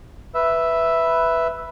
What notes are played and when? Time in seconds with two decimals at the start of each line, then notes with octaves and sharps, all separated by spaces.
0.34 B4 E5